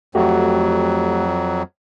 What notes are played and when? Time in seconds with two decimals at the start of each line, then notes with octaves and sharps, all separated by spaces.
0.15 F2 F#3 A3 F#4 G4